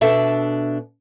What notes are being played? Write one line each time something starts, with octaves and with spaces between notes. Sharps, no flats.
B2 D4 A4 E5